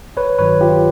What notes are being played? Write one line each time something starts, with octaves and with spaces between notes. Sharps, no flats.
G#1 B4 C#5
G2 D#3 F#3 B4 C#5
G#1 F4 G4